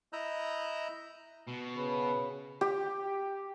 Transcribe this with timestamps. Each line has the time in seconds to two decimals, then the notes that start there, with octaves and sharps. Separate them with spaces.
0.13 E4 D#5 A#5 E6 F#6 G6
1.47 B2
1.77 C#3 B4
2.61 G4